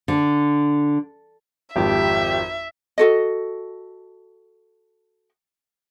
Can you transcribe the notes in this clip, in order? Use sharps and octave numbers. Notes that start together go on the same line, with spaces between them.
D3
G#1 F2 G4 E5
F#4 A4 D#5